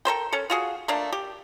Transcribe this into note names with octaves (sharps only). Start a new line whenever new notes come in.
A4 A#4 C5 G5
C#4 A4
F4 F#4 G#4
A3 A#3 D4
G4